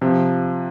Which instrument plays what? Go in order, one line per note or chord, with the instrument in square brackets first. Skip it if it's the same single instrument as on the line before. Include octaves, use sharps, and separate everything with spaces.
[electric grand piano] C3 [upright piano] F3